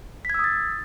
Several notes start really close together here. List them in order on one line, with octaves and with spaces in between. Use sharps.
B6 G#6 E6 D#6 A6